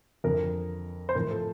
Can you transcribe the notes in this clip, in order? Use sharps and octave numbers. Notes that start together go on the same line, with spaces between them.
F2 D3 F3 A#4
C5
A2 F3 A#4
A4